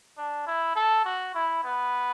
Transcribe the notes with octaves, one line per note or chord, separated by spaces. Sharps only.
D4
E4
A4
F#4
E4
B3